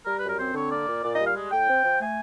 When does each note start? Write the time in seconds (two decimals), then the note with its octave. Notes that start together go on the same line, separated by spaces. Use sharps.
0.06 G3 A#4
0.17 B4
0.23 F#2
0.28 A#4
0.38 C4 C5
0.55 D3 C#5
0.71 A#3 D5
0.87 A#2
1.03 A#2 D5
1.14 D#5
1.19 G3 F5
1.35 G#3
1.51 A2 G5
1.68 C4
1.83 F3
2.00 A3 G#5